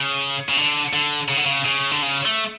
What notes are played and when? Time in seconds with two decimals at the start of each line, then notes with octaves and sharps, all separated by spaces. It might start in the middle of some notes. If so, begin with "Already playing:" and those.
Already playing: C#3
0.49 C#3
0.57 D3
0.94 D3
1.29 C#3
1.38 D3
1.46 C#3
1.65 C#3
1.91 D3
2.02 C#3
2.26 A3